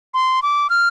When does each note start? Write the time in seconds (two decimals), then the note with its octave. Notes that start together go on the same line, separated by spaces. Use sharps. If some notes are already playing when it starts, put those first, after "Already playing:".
0.14 C6
0.42 D6
0.70 F6